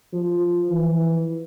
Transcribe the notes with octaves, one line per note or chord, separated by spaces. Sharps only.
F3
E3